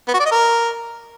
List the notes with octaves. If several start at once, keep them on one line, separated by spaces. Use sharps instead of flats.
B3
F#4
D5
D#5
A#4